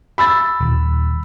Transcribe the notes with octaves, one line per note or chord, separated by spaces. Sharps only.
B5 E6 A6
D#1